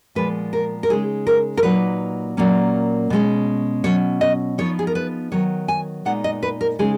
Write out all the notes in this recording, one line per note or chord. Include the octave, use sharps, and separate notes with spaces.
A#2 F3 G#3 B3 B4
A#4
A#4
C#3 G#3 D#4 G#4
A#4
A#4
A#2 F#3 A#3 D#4 B4
A#2 F#3 A#3 C#4
B2 G#3 C#4
B2 F#3 C#4 C#5
D#5
F3 B3 D#4 C#5
G#4
A#4
B4
D#3 F#3 B3 C#5
G#5
A#2 G#3 B3 D#4 F#5
D#5
B4
A#4
C#3 G#3 D#4 G#4